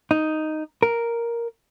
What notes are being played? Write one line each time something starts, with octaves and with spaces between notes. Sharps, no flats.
D#4
A#4